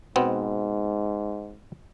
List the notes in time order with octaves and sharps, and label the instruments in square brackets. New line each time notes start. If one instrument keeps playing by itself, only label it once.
[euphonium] G#2 [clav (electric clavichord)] B2 B3 C4